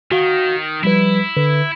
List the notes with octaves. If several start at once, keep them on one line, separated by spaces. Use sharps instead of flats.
D#3 F#4 F5
F3 G3 E4 B4
D3 B4